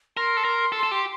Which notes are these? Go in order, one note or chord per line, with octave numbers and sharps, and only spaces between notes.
A#4 C6
A4
A#4
A4
A4
G4